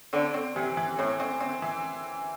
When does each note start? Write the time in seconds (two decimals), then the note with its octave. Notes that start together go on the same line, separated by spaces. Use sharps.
0.13 D3 C4
0.34 C4
0.56 C3 E3
0.77 E3
0.98 A2 C4
1.20 C4
1.41 C4
1.62 E3